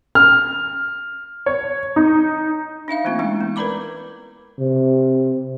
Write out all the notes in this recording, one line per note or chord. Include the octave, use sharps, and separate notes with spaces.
F6
C#5
D#4
D4 D#4 E5 F5
E3 A3 A#3 C4 F4
G#3 C#4 E4 E5
B3
A#4 B4 D5 A#5 B5 D6
C3